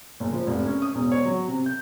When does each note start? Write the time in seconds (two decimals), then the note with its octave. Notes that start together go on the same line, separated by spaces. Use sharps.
0.20 F#1
0.33 F3
0.47 F1
0.66 C#4
0.82 D#6
0.95 E1
1.12 C#5
1.25 F#3
1.48 C3
1.66 G6